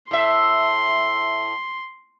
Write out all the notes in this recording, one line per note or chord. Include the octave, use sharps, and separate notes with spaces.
A2 E5 C6